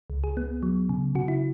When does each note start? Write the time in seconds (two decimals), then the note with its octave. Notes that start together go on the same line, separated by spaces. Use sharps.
0.10 C#2
0.24 G#4
0.37 B3
0.63 F#3
0.89 C#3
1.15 C#3 F#4
1.28 E4